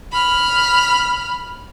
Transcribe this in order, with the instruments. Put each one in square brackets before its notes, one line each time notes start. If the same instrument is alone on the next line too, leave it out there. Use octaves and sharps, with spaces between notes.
[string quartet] B5 F6